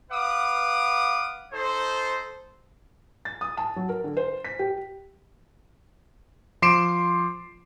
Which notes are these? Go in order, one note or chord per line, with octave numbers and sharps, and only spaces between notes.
B4 F5 F#5 D6 D#6
D#4 A4 C5
A6
D#6
A5
F#3
A#4
D3
C5
B6
G4
F3 C6 D6 C7 D7 E7